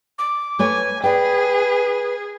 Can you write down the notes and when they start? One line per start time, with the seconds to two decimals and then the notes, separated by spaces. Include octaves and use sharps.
0.19 D6
0.59 A3 B4 C#5 G#5
1.04 G#4 B4 D5 G5